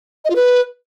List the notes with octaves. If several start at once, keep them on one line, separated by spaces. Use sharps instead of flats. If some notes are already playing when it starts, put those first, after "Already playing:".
D#5
F4
B4